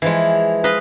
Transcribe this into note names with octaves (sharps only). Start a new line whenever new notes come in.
E3 F3 G#3
B4 D#5 F5